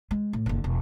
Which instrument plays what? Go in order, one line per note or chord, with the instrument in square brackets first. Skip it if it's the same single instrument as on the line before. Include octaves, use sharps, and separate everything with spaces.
[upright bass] G#3
A2
F#1 D3
E1